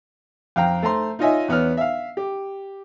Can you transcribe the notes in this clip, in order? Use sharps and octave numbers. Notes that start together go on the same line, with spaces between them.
F2 F5 G5 A#5
A3 C5 A#5 C6
D#4 F4 C#5 D#5 E5 G#5
E2 B3 C#5 F6
E5 F5
G4